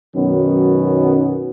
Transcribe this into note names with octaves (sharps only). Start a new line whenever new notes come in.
F#2 B2 D#3 F#3 B3 C#4